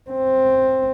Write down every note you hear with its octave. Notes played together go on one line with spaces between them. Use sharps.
C4